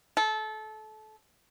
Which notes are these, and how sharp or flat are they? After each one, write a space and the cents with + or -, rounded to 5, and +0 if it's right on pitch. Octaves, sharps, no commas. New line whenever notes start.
A4 -25